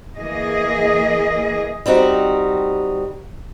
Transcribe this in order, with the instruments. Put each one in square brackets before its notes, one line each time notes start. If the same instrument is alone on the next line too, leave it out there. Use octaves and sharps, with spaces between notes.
[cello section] E3 A#3 G#4 D#5
[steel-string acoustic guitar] G3 C4 D#4 F#4